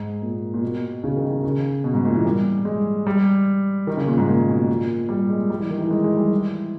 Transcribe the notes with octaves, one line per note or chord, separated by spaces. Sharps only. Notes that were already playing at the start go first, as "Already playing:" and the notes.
Already playing: G#2
A#2
A#2
B2
C#3
D#3
D#3
C#3
B2
G#2
A#2
E3
G3
G#3
G3
D#3
C#3
A#2
G#2
A#2
B2
A#2
G3
G#3
G3
E3
D#3
E3
G#3
G#3
G3
E3